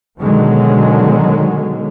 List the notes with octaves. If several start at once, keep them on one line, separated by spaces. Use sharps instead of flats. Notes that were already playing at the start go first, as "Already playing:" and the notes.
B2 D3 D#3 F#3 G#3